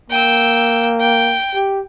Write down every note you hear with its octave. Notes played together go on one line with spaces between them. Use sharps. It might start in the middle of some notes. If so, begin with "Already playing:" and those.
A#3 G5 E6
G5
G4